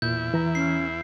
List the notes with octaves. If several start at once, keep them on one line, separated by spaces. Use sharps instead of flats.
E2 A#2 E4 G6
E3 A#5
C#4 C7